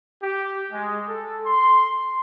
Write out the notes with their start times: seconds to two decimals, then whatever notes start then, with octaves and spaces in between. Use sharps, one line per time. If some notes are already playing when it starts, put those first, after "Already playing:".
0.23 G4
0.72 G#3
1.08 A4
1.46 C6